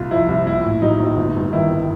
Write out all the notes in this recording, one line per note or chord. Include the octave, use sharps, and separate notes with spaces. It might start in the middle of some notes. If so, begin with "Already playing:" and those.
Already playing: C2 A#2 F4
F3 E4
C2 E4
A#1 E4
A2
F#3 D#4
A#1
G1
G2
D#3 E4
G1